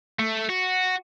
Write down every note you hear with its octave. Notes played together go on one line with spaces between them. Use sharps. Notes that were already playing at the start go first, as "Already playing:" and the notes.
A3
F#4